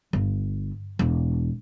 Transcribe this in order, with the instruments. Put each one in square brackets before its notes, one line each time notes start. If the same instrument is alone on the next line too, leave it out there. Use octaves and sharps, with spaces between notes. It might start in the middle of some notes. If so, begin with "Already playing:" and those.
[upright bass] G1
E1